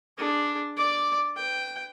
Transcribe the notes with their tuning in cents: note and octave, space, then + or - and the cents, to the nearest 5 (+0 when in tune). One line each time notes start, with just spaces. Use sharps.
D4 +0 G#4 +0
D5 +0 D6 +0
B4 +35 G5 +0